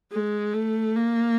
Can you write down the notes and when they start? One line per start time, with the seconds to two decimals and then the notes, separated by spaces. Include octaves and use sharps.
0.12 G#3
0.53 A3
0.96 A#3